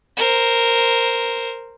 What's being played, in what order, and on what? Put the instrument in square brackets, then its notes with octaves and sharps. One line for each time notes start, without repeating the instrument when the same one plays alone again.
[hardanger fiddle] A#4 C5